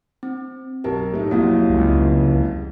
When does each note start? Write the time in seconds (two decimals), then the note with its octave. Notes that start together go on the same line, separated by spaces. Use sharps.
0.23 C4
0.84 B1 G4 A#4 A5
1.12 A2 A3 D#4
1.31 C2 F2 F#3 A#3 E4 F5
1.70 C#2